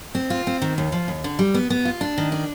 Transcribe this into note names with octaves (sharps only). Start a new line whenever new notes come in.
C4
F4
C4
D#3
D#2
F3
D#2
D3
G3
B3
B3
F4
D4
D#3
D4